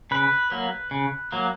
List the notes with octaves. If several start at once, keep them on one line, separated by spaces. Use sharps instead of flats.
C#3 B4
F#3 A#3
C#3
F#3 A#3